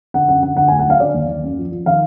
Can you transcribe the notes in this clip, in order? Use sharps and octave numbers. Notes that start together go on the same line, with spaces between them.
D3 F#5
F#2 F#5
D3 F#5
D3 F#5
G#5
D2
F#5
F#3 F5
D3 D5
D#2
D#2
F#2
F3
F3
D#3 F5